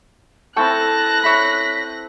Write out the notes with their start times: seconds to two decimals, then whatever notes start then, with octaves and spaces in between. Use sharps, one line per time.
0.56 C4 E4 A4 G5 A5 C#6 F#6 A#6
1.23 C#5 E5 B5 B6